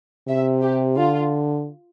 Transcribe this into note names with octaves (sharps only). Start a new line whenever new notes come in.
C3 E5
G4
D3 F4